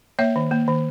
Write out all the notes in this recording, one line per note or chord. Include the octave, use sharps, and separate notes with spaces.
A#3 C#5 E5
D#3
A#3
D#3